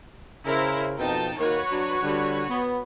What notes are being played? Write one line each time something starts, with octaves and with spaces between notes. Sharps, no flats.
C#3 E4 A#4 C5
F2 B2 D#4 G5 A5
D#3 A#3 F#4 B4 C#5
F#3 D4
D3 G3
B3